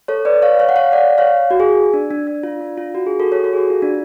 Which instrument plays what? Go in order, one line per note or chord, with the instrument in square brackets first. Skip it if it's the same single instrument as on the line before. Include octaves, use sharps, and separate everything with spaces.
[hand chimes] A4 C#5
B4 D5
C#5 F5
C#5 F5
F#5
C#5 F5
D5 F#5
C#5 F5
F#4
G#4
D4
D4
D4
F4
D4
F4
F#4
G#4
F#4 A4
A4 C#5
F#4 A4
G#4
F#4
F4
D4